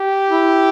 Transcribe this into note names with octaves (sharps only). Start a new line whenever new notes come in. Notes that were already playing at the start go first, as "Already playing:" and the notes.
Already playing: G4
E4